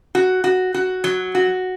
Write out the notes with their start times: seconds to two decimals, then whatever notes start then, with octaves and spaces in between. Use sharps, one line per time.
0.15 F#4
0.44 F#4
0.74 F#4
1.04 F#3
1.35 F#4